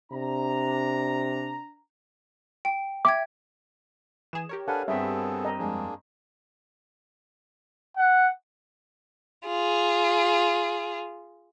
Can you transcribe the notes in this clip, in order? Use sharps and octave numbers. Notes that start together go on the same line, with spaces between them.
C3 D4 A#5
G5
E5 G5 D6 G#6
E3 G#4 E7
G4 A#4 C#5
D4 A4 B4 F5 F#5 G#5
G2 B3 C4 G#4 A4 E5
D#5 A#5
F2 G#3 A#3 D4 G#4
F#5
F4 G#4